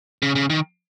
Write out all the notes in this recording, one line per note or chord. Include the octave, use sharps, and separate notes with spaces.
C#3
C#3
D#3